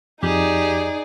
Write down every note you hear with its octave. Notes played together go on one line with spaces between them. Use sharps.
F2 D#4 G4 G#4 D5